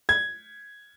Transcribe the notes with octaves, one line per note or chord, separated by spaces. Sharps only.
G#6